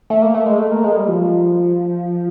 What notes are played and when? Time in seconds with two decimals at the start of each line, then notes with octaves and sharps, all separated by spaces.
0.10 A3
0.22 A#3
0.34 A3
0.46 G#3
0.59 A3
0.72 A#3
0.84 G#3
0.96 G3
1.08 F3